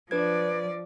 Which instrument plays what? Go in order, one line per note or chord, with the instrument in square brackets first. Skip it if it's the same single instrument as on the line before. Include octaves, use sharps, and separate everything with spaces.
[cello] F3 D5 [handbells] D4 B4 G#6